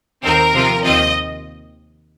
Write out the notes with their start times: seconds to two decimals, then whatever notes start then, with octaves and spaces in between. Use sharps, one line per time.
0.24 D#2 D#3 C4 A#4
0.54 C3 F3 C4 F4
0.84 D#2 D#3 C4 F4 D#5